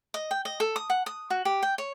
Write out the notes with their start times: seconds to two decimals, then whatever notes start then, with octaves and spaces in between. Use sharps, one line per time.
0.14 D#5
0.31 G5
0.45 D#5
0.60 A4
0.76 D#6
0.90 F#5
1.06 D#6
1.30 F#4
1.45 G4
1.63 G5
1.78 C#5